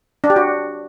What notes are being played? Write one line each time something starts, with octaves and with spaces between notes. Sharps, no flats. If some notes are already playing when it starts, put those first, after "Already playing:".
D4
G4
F#4